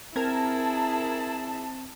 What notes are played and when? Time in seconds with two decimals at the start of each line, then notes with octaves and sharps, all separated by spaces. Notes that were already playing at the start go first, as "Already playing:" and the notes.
0.16 C4 E4 G#4 A#4 A5 A#5 G#6